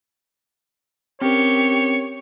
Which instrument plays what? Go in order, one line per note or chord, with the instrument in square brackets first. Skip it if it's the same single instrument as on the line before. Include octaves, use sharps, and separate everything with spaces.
[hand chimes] C4 C#4 A#4 [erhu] G4 [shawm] C#5